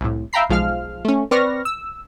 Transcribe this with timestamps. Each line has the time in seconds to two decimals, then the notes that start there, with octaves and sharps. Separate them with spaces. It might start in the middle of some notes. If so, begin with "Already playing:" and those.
0.01 C2 A2
0.33 E5 F5 G5 A#5 B5 C7
0.50 B1 F3 G#3 F5 F6
1.05 A3 C#4
1.31 C4 B4 D5 C#6 F6 A#6
1.65 E6